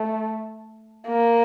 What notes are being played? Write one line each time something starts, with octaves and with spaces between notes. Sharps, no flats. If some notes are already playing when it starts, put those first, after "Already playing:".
Already playing: A3
A#3